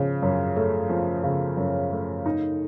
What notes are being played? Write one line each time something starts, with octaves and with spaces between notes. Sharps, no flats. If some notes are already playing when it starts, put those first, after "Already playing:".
Already playing: C#3 F3
F#2
A3
F3
C#3
F#2
A3
D#4